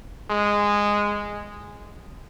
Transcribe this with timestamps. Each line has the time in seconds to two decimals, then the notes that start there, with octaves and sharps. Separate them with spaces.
0.30 G#3